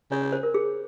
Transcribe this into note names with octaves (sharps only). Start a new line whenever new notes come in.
C#3 C#5
C#5
C5
A#4
G#4